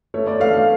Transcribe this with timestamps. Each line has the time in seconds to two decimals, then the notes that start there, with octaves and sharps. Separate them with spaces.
0.14 A3 C#5
0.27 D5
0.40 A3 F5
0.54 F5